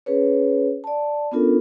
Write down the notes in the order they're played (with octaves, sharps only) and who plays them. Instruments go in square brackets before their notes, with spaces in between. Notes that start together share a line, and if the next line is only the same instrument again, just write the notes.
[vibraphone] C#4 G#4 B4 C#5
D5 A5
B3 C#4 D4 F4 A4 A#4